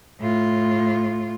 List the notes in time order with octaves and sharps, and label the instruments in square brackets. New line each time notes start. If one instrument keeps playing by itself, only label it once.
[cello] A2 F4